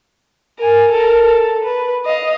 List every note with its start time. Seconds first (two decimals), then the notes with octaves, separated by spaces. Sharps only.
0.58 A#4 G#5
0.91 A4 A#4
1.25 A4
1.64 B4
2.05 D#5 F5